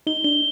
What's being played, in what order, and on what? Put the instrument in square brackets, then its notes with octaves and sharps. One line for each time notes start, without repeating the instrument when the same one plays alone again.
[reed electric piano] D#4 [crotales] G7
[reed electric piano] D4 [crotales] G7